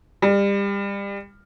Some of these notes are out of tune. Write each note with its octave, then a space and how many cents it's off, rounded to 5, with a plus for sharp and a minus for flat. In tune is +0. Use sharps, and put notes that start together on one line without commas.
G3 +30